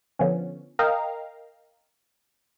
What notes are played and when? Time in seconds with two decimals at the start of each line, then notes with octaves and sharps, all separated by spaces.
0.19 D3 F3 B3 C#4
0.79 A#4 D#5 F5 G5 A#5